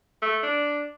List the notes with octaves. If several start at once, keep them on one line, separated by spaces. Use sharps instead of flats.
A3
D4